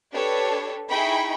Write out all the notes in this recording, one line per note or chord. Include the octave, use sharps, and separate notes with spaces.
D4 G4 A4 B4 C#5
D#4 E4 G#4 G5 B5 C#6